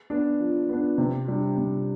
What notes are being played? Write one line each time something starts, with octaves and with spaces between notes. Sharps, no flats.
B3 D4
F3
B3 D4
C3
G3 D4
C3